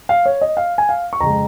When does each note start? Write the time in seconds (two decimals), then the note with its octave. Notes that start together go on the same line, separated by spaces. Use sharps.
0.09 F5
0.26 C#5
0.41 D#5
0.57 F5
0.78 G#5
0.89 F5
1.13 C#6
1.20 F2 C#3 G#3 A#5